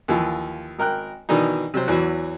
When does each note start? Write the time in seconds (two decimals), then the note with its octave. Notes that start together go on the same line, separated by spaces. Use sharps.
0.08 D#2 E3 F3
0.78 G#1 A#4 G5 F#6
1.29 B2 D#3 E3 D4 D#4
1.74 C3 F#3 C5
1.88 E2 E3 F#3 F#4